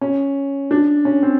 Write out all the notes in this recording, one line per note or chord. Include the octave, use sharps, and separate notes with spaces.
C#4
D4
C#4
C4